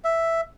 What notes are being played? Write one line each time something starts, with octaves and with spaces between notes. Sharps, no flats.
E5